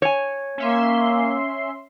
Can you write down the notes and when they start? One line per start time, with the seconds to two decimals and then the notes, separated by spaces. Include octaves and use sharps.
0.02 C#5 G#5
0.58 A#3 C#4 E5 C6